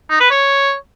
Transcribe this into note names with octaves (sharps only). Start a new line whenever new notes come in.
D#4
B4
C#5